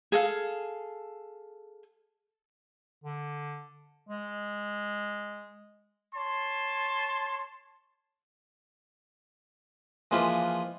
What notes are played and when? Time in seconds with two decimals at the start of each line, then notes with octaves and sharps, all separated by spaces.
0.12 G#4 A4 F5
3.04 D3
4.09 G#3
6.15 C#5 A5 C6
10.11 E3 F3 G#3 A#3 F4 B4